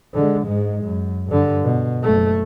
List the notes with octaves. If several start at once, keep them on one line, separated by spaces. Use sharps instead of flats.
D3 G#3
G#2 G#3
F#2
G2 D3
B2
F#1 A3